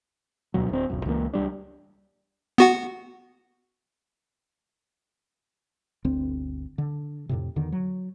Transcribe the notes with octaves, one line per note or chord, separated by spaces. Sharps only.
D2 G2 B2 F#3
D1 C4
D1 B1 F#2
C#2 E3 F3 A#3
C#2 G#2 G3 D4
B3 F#4 F#5
G1 D2 C4
D3
F2 A2 C3
E2 D3 D#3
F#3